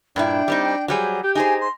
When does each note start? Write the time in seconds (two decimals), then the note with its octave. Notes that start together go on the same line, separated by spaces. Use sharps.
0.16 G2 A#2 D4 E4 G5
0.48 G3 C4 D#4
0.88 F#3 G3 G#4 C5
1.24 G4 G6
1.35 D#4 G#4 C5 G#5
1.61 C6